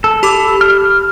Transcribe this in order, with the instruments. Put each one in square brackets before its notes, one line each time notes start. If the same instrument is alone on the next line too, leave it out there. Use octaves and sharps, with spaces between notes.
[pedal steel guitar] A4
[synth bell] G4 B5 D6
[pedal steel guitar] F6